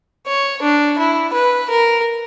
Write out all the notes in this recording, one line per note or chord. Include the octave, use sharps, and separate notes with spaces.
C#5
D4
E4
B4
A#4